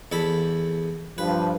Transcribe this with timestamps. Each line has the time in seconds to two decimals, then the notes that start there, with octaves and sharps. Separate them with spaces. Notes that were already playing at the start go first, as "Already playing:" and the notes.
0.12 E2 A4 B5
1.18 G2 F3 B4